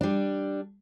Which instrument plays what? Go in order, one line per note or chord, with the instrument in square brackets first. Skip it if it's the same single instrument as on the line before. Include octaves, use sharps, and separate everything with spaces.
[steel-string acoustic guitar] G3 D4